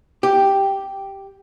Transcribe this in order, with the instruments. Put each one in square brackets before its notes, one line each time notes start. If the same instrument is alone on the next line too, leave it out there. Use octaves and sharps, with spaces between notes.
[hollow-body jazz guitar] G4